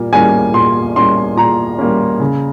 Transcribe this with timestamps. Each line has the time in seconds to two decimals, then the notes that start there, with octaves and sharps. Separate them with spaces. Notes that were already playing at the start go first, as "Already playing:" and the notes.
Already playing: A#2 G3 A#3
0.13 G3 A#3 C#4 G#5
0.54 A#2 C6
0.96 G3 A#3 C#4 C6
1.37 A#2 A#5
1.78 G3 A#3 C#4
2.20 C#3